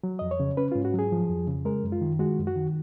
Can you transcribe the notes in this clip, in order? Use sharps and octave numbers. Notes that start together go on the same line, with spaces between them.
F#3
F2 D#5
C#5
C#3
C#4 B4
G#2 F4
F#4
F#3 G#4
F3
F2
C#3
G#3 A#4
F#2
F4
D#3
G#3 F#4
F#2
F#4
D#3